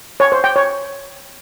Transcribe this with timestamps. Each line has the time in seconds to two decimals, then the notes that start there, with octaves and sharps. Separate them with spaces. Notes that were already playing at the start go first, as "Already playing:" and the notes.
0.20 C#5
0.32 C5
0.44 G5
0.56 C#5